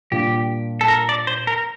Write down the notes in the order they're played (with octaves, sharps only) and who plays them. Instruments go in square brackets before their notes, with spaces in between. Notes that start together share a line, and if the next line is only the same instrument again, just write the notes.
[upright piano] A#2 G3 D4 F4 [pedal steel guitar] G4
[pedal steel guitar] A4
A#4
D5
C5
A#4